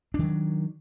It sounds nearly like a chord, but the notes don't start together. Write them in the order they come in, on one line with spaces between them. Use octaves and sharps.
D4 D#3 F#3